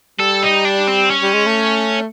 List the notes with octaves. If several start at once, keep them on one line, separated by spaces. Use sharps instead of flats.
G3 A4
D#4
D4
C4
C#4
G3
G#3
A3